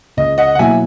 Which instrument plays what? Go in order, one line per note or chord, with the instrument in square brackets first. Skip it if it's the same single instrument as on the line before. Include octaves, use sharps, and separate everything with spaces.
[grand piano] C#2 [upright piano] D#5
[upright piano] D#5 F#5
F#5
[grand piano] B2 F#3 A#3 E4 [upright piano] E5 G#5